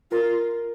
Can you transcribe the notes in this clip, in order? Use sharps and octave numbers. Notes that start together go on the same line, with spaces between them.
F4 A#4